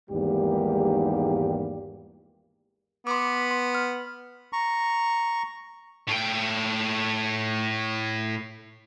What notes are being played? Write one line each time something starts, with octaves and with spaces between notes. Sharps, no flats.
G#1 E2 G#2 G3 A#3 G4
B3 C6 D6
C6
F6
A#5 C#6
A2 G5